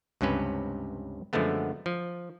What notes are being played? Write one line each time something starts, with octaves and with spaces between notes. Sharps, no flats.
C#2 G2 C3 C#4 B4
F#2 D3 F3 G#3 A3 B3
F3